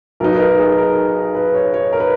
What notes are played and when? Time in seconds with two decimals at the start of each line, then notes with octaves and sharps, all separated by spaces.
0.20 B1 B2 F#3 B3 D#4 A#4
0.33 B4
0.39 A#4
0.58 G#4
0.78 A#4
1.35 B4
1.55 C#5
1.74 C#5
1.93 A#4
2.00 B4